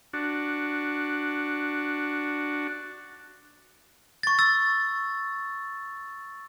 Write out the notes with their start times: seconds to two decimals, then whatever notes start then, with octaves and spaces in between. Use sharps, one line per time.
0.13 D4 F#4
4.23 C#6 A6
4.39 E6 A6